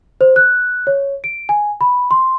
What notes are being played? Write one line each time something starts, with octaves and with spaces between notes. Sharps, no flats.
C5
F#6
C#5
D7
G#5
B5
C6